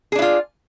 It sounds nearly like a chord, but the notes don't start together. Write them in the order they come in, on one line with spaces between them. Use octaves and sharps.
G#4 D4 E4 F4